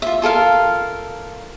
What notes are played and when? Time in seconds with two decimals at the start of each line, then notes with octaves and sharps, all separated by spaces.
0.02 F4 E5
0.22 F4 A4 A#4 F5